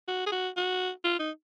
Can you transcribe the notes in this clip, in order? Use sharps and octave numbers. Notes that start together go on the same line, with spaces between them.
F#4
G#4
F#4
F#4
F4
D#4